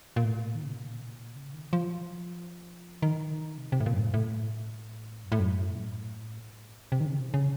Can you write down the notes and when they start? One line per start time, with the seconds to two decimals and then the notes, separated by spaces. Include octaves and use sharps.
0.16 A#2
0.24 A2
0.55 D#3
0.63 C#3
0.72 C3
0.80 A#2
1.36 C#3
1.54 D#3
1.73 F3
3.02 D#3
3.58 C3
3.72 C3
3.80 A2
3.86 A#2
3.93 F#2
4.00 A2
4.14 A2
5.25 F#2
5.32 A2
5.39 F#2
5.74 A#2
5.81 A2
6.92 C3
7.00 D#3
7.06 C#3
7.20 C3
7.29 D#3
7.34 C#3